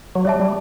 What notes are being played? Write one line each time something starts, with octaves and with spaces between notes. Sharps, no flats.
F#3
G3 C#5 E5 A5
G3